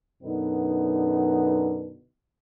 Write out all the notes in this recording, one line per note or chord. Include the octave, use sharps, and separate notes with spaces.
F#2 B2 D3 B3 D#4